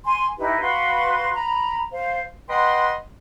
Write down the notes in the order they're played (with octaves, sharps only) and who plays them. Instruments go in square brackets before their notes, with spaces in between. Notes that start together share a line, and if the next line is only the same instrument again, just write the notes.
[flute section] G#5 C6
D#4 E4 G4 B4
F#4 B4 F5 C6
A#5 B5
C5 F5
[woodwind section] B4 D#5 F#5 G5 B5 C6